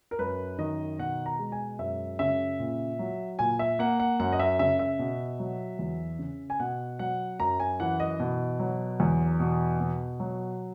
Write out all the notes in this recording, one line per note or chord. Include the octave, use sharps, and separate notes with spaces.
A#4
F#2 B4
D#3 D#5
B2 F#5
A#5
G#3
G#5
F#2 E5
C#3 E5
A#2
F#3
A#2 G#5
E5
A#3 F#5
F#5
F#2 F#5
D#5
E5
C#3 E5
E5
B2
F#3
E2
C#3
G#5
B2 F#5
F#3 F#5
F#2 A#5
G#5
E3 F#5
D#5
B2
F#3
E2
B2
B2
F#3